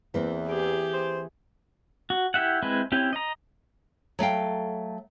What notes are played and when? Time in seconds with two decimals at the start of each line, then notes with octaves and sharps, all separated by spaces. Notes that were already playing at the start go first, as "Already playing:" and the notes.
0.14 E2 E3 A#3 C4
0.47 G4 G#4
0.93 C5
2.10 F#4
2.34 E4 G4 E5 F#5
2.63 G#3 C4 E4 B4
2.92 C4 C#4 E4 G4
3.13 D#5 A#5
4.19 F#3 A3 F5 G5